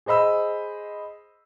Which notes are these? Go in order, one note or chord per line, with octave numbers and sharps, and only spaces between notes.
G#4 C5 D#5 B5 E6